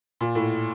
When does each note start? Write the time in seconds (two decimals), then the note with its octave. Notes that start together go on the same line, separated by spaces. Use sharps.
0.21 A#2
0.35 A2